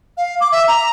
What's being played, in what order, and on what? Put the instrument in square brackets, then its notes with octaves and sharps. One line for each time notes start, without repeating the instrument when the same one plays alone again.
[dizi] F5
D6
E5
A#5